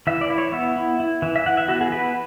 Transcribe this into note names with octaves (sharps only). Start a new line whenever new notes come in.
E3 E5
D5
E4
C#5
B3 E5
E4
E4
E3
E5
E3 F#5
E5
B3 F#4
G#4
E4 B4